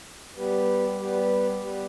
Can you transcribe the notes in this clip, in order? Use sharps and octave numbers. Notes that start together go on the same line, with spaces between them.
G3 B3 G4 B4
G3 B3 G4 B4
G3 B3 G4 B4